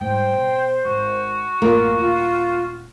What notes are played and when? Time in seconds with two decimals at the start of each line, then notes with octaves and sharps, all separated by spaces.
0.01 G#2 G3 C5 G5
0.33 B2
0.85 G#1 F#4
1.62 A1 F#2 A#3 F4
1.99 D#1 F4